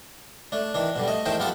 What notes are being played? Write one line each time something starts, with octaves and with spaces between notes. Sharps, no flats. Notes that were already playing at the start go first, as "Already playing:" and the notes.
A3 D4
D#3 E3 D4
B2 D3 G3
A3 D#5
E2 D#3 A3 D#4 C5 G5
B3 F4 G4 A4 F#5 A5